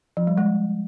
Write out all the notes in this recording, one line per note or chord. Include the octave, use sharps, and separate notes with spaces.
F3
G3
G#3